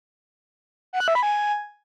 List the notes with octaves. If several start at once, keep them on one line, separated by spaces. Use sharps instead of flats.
F#5
F#6
E5
B5
G#5